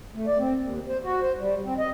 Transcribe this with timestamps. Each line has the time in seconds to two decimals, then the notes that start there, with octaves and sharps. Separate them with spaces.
0.14 A3
0.27 D5
0.39 C4
0.58 D#2
0.88 C5
1.04 F#4
1.22 C5
1.39 G3
1.64 C4
1.78 D#5